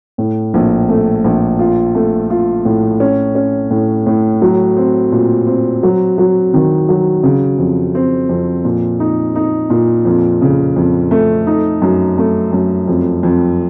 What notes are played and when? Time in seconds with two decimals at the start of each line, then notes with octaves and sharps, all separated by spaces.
0.18 A2
0.54 A#1
0.89 A3
1.24 A#1
1.59 F4
1.95 A3
2.30 F4
2.65 A2
3.00 C#4
3.35 C#4
3.70 A2
4.06 A2
4.42 F#3
4.77 C4
5.12 A#2
5.47 C4
5.83 F#3
6.18 F#3
6.54 D#3
6.89 F#3
7.23 C#3
7.58 F2
7.95 C4
8.29 F2
8.65 A#2
9.00 D#4
9.35 D#4
9.70 A#2
10.05 F2
10.42 C#3
10.76 F2
11.11 A3
11.47 D#4
11.82 F#2
12.18 A3
12.52 F#2
12.88 F2
13.23 F2